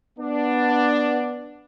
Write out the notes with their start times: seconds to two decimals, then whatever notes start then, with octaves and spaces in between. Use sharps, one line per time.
0.18 B3 D4